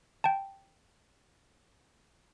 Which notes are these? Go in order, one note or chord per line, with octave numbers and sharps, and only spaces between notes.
G5 A5